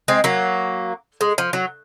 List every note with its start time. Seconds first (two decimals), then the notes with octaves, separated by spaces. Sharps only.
0.08 G#3 C4
0.24 F#3 A#3
1.21 G#3
1.38 F3
1.53 F#3